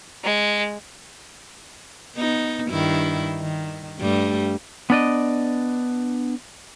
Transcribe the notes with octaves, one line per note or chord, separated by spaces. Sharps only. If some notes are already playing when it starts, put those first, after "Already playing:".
G#3
B3 D#4
G2 D#3 E4
D#3
G2 G3 A3
B3 D4 D5 D#5